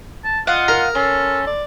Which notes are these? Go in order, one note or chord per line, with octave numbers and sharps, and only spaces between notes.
A5
F4 D#5 F5 F#5
A#4 A#5
C#4 A4 C6
D5